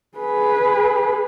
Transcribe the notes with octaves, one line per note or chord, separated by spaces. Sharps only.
G#4 B4